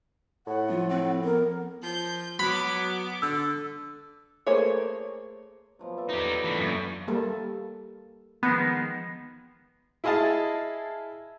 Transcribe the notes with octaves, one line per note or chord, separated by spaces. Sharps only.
A2 F#5
F3 F4
C4
B3 A#4
F3 G6
F#3 B3 B5 D6
D3 E6
A3 A#3 G#4 C5 C#5
B2 F3 F#3
A4 D5 E5
D#4 G4
A#2 D3 E3 A3
F#2 F#3 B4 E5
G3 A#3 A4
D#3 F3 G#3 B3
E4 G#4 D#5 F5 A5